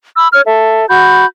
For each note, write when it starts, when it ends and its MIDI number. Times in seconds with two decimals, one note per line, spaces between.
0.15 0.28 83
0.15 0.28 88
0.33 0.40 73
0.33 0.40 89
0.45 0.85 69
0.45 0.85 76
0.88 1.24 66
0.88 1.24 83
0.88 1.24 91